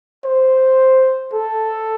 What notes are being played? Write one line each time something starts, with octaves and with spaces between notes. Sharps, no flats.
C5
A4